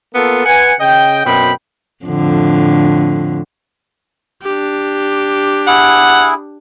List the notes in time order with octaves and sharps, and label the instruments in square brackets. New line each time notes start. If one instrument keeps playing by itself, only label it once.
[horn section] A#3 B3 F4 A4
B4 F#5 G#5
C#3 D#5 G5
F#2 B2 C4 G5 B5
[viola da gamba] F2 A2 D3
[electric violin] D4 G4
[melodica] E4 G#4 [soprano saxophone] F#5